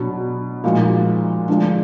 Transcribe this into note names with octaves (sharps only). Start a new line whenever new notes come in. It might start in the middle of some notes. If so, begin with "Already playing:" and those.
Already playing: B2 F#3 D4
A#2 F3 G#3 D#4 F#4
D3 F3 G#3 D4